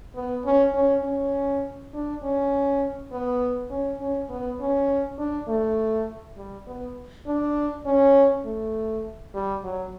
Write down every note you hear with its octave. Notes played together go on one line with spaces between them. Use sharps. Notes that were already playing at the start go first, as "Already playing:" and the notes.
B3
C#4
C#4
C#4
D4
C#4
B3
C#4
C#4
B3
C#4
D4
A3
G3
B3
D4
C#4
A3
G3
F#3